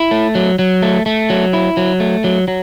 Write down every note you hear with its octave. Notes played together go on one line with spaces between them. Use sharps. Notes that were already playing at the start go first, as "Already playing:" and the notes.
Already playing: E4
A3
F#3
F#3
A3
A3
F#3
E4
F#3
A3
F#3
F#3